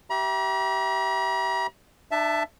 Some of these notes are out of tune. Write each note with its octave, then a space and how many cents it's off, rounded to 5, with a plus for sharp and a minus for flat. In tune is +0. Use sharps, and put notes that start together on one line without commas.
G4 -25 E5 +0 A#5 +45
D4 +45 E5 +15 A5 +0